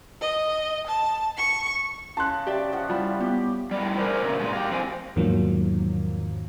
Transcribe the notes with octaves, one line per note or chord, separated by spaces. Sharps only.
D#5
A5
C#6
C#3 A5 C6 F#6
G4 D5 E5
F3 F#4 F#5
G3 E4 F4 B5
B3 G4
A2 G3
A3 D4 G#4 A#4 C5
A#2 C#3
G2 A#2 G#3
G4 F5
F2 A2 C4 C5 G#5
E2 G#2 D#3 F3 F#3 A#3